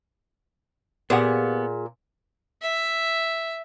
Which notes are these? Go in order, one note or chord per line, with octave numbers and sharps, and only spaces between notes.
A#2 B3 G4 G#4 F#5 G#5
E5